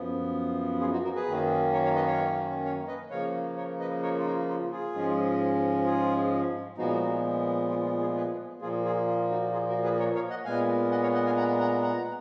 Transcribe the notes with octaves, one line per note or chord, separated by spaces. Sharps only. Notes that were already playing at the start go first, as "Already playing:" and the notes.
Already playing: F#2 F3 B3
F4 G#4
D#4 F#4
F#4 A#4
G#4 B4
F#2 D#3 A#3 C#4
A#4 C#5
C#5 F5
B4 D#5
C#5 F5
C#5 F5
B4 D#5
C#3 F3 A#3 C#5 F5
A#4 C#5
B4 D#5
A#4 C#5
F4
D#4
F4
F4 G#4
G#2 F3 G#3 C#4
F4 G#4
A#2 F3 G#3 B3 D#4 F#4
F4
F4
F4 G#4
G#4 B4
A#2 F3 A#3 F4 G#4
F4 G#4
F4
D#4 F#4
F4 G#4
F#4 A#4
G#4 B4
A#4 C#5
C#5 F5
D#5 F#5
A#2 G#3 B3 F5 G#5
D#5 F#5
C#5 F5
D#5 F#5
F5 G#5
F#5 A#5
F#5 A#5
F#5 A#5